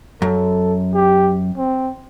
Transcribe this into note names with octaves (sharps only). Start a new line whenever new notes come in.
F#2 A4
G4
C4